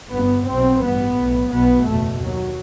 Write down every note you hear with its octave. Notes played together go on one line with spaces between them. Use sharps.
G1 G2 B3
B1 B2 C4
A1 G2 B3
B1 A2
B1 B2 B3
F#1 E2 B2 A3
D#2 F#3